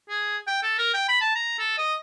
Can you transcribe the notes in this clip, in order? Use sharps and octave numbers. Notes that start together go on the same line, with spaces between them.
G#4
G5
A4
A#4
G5
B5
A5
A#5
A4
D#5